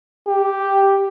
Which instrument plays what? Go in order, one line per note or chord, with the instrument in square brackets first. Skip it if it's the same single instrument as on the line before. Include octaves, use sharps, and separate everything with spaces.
[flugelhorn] G4